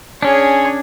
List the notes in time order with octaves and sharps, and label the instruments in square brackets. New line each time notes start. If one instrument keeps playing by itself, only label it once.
[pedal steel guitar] C#4 D4 [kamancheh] G#4 C#5